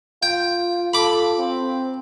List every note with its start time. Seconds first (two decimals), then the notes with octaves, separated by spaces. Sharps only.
0.23 F4 G5
0.93 A4 B5 D6
1.38 C4